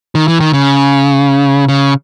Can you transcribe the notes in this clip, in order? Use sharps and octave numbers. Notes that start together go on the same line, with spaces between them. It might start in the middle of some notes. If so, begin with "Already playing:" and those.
D#3
E3
D#3
C#3
C#3